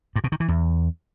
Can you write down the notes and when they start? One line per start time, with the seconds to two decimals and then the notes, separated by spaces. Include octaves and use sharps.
0.16 G2
0.24 B2
0.32 D#3
0.40 E3
0.48 E2